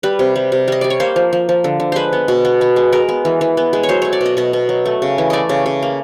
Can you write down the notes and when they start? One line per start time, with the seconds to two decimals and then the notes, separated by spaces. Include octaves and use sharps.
0.03 G3 B4
0.19 C3
0.36 G3
0.52 C3
0.68 G3 D#5
0.81 G3 D5
0.90 C#5
1.00 A#3 C5
1.16 F3
1.33 F3
1.49 F3
1.64 D3
1.80 D3
1.92 G#3 B4 C5
2.13 B3
2.28 B2
2.45 B3
2.61 B3
2.76 G#3
2.93 G#3 A#4
3.09 B3
3.25 E3
3.41 E3
3.57 B3
3.73 G#3
3.83 C#5
3.89 F#3 C5
4.02 A3 C#5
4.13 D5
4.21 B2 D#5
4.37 B2 D#5
4.53 B2
4.69 F#3
4.86 A3
5.02 C#3
5.18 E3
5.30 A3 D5 D#5
5.49 C#3
5.66 C#3
5.83 A#3